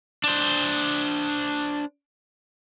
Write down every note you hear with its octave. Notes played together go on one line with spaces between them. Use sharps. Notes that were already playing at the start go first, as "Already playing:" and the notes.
D4 C5